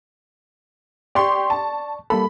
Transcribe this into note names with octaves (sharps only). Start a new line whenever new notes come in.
G4 D5 C6 C#6
A5
G3 A#3 A4 B5